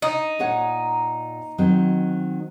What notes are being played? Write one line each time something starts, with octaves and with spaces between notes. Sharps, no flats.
D#4
A#2 C#5 F#5
D#3 F#3 C4